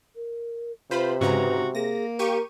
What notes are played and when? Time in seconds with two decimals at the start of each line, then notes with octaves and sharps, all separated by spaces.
0.16 A#4
0.91 C3 F4 B4 C5 B5
1.21 G#2 C#3 F#4 B4 A#5
1.75 A#3 G#4 A#6
2.19 G4 A#4 F5 C#6 D#7